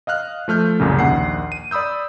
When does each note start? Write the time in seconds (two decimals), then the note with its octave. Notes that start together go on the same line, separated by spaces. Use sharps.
0.07 D#5 F5 F6 F#6
0.48 F3 A3 F6 G6
0.80 C2 F#2 A#2 C#3
0.99 A#1 D#2 F#5 C7
1.52 D#7
1.71 D5 B5 D#6 E6 G6